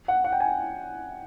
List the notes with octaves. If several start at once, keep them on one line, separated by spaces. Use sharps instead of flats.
F#5
F#5
G5
G#5